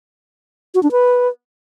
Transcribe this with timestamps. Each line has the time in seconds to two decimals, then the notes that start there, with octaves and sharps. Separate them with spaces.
0.74 F#4
0.83 D4
0.92 B4